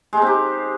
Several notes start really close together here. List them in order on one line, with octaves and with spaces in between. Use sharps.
G#3 D#4 C4 G4